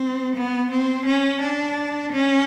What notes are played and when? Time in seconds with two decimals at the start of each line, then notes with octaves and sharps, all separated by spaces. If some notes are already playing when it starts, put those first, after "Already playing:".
Already playing: C4
0.36 B3
0.71 C4
1.06 C#4
1.42 D4
2.12 C#4